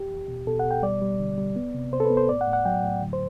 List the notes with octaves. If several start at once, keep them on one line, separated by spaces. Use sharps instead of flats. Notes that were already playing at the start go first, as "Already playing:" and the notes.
Already playing: G4
E2
B2
B2 A4
F#5
B2
G5
G3 D5
G3
D3
G3
B3
C3
C3 C5
A4
B4
B3
C5
A2 D5
F#5
A2
F#5
F#3 G5
A2
D3
C5